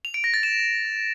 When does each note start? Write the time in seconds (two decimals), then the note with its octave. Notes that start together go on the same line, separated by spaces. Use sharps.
0.05 F7
0.14 D7
0.24 A#6
0.34 A6
0.43 E7